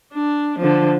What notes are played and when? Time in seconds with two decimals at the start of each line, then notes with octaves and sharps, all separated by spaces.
0.13 D4
0.59 D3 F3